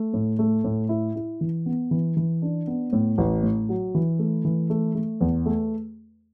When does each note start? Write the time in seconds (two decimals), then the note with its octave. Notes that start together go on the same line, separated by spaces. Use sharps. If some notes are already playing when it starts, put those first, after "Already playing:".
Already playing: A3
0.14 A2
0.39 A3
0.64 A2
0.89 E4
1.15 E4
1.41 E3
1.66 B3
1.91 E3
2.17 E3
2.42 D4
2.67 B3
2.93 A2
3.18 A1
3.43 A2
3.69 F#3
3.95 E3
4.19 A3
4.45 E3
4.70 A3
4.95 A3
5.21 E2
5.46 A3